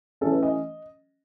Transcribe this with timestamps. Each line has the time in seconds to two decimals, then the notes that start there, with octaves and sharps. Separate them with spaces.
0.21 E3 A3 C#4 A4
0.32 B4
0.43 D#5